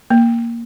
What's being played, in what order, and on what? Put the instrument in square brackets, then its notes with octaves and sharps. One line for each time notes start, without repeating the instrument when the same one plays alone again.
[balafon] A#3